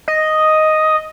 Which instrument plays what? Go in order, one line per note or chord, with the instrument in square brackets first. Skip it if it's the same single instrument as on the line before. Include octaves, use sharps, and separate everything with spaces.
[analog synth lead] D#5